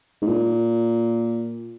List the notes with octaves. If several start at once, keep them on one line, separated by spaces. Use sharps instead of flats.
G#2
A#2